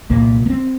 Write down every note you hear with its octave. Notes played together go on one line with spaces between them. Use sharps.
C2 A#2 A#3
A#3
C4